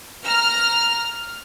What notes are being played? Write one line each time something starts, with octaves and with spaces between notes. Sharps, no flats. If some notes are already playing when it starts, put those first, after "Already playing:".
A#5 F6